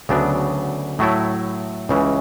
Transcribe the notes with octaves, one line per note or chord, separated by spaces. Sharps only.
D2 C#3 F#3 B3 D4
A2 F#3 A3 E4
C#2 C#3 E3